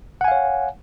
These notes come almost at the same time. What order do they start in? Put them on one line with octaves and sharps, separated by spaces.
F#5 G#5 F5 C#5